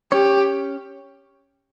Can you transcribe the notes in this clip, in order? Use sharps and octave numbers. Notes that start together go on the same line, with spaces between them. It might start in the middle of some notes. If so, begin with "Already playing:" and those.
C#4 G4 C#5